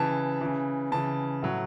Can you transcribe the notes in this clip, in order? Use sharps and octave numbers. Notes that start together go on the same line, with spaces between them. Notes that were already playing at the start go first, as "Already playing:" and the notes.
Already playing: C#3 E3 A5
C#3 E3
C#3 E3 A5
A2 F#3